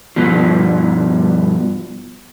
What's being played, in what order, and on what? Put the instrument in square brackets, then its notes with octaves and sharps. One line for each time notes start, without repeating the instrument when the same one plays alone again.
[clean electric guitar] G2 B2 F3